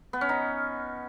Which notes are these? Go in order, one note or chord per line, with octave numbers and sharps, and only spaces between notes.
B3
C#4
D#4